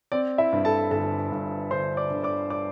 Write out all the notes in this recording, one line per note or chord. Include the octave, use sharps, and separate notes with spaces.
C4 D5
E4 E5
G2
A4 A5
G1 A4 A5
G2
D3 C5 C6
D5 D6
D3
D5 D6
D5 D6